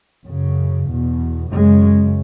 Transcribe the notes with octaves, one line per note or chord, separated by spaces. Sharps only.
F#2 C#3
E2 B2
F#2 C#3 G#3